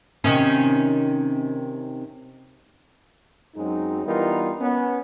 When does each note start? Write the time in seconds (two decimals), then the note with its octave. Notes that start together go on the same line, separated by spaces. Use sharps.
0.24 C3 D#3 C#4
3.56 F#2 F#3 G#3 C4 D#4
4.05 E3 G3 B3 D#4 F4 A#4
4.60 B3 C#4